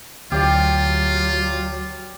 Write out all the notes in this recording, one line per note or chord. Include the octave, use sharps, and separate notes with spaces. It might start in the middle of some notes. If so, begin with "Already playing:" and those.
D2 F#3 F4 G4 D5